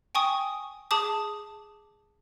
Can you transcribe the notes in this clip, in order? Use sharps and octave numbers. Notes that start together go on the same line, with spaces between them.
G5 G#5 C#6 D#6
G#4 A5 D6 D#6